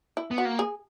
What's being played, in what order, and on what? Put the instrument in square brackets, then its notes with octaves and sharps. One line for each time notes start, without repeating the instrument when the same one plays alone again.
[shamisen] E4
[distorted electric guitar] B3
[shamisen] F#4
[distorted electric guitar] A#3
[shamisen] G#4